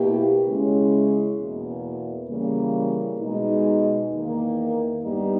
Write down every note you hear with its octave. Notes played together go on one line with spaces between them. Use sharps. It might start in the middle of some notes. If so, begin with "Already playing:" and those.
Already playing: B2 A#3 E4 G4
C#3 G#3 C#4 E4
E2 B2 A#3
C#3 E3 G3 A#3
B2 G#3 D#4
E2 D#3 A#3
G2 G3 B3 D#4 G4